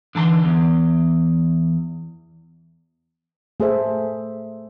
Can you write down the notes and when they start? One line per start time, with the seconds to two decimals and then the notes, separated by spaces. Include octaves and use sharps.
0.15 D3 E3 A5 C6
0.45 E2
3.60 A3 G#4 A4 C5 E5